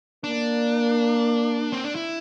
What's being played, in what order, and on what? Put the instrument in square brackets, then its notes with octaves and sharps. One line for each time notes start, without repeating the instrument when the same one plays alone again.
[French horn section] A#3 [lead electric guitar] D4
[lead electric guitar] C4
D4
E4